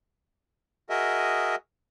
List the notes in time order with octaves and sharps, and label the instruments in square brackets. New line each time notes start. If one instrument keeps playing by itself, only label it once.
[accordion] F#4 G#4 A#4 D#5 E5